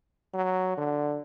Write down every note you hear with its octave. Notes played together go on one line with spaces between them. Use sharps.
F#3
D3